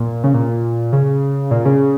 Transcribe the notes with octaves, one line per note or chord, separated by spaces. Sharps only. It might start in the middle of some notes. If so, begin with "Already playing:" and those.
Already playing: A#2
C#3
A#2
C#3
A#2
C#3